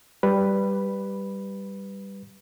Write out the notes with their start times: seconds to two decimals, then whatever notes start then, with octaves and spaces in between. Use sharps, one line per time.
0.23 G3 B4